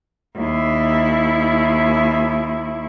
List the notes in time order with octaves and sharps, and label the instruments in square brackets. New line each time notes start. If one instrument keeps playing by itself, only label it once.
[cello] D#2 E4